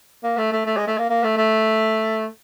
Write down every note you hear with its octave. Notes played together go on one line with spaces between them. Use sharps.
A#3
A3
A3
A3
G#3
A3
A#3
A#3
A3
A3